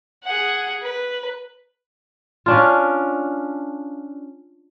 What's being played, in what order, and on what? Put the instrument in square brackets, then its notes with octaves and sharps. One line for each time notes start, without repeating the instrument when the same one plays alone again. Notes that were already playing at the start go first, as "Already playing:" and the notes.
[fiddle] G#4 F#5
B4
[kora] C#4 D4 F4